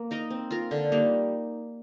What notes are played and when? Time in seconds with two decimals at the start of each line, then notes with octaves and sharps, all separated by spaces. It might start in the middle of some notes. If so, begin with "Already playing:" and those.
Already playing: A#3
0.11 D#4 A#4 D#5
0.30 C4
0.51 F4 A#4
0.71 D3
0.92 G3 A#3 D#4